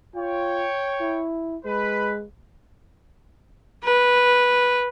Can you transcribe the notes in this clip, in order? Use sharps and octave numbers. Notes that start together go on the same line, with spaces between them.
F4 C#5 G5
E4
G#3 B4
B4